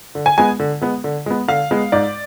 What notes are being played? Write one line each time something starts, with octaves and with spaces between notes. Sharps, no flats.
D3
G#5
G#3 B3 G#5
D3
G#3 B3
D3
G#3 B3
D3 F5
G#3 B3
G#2 D5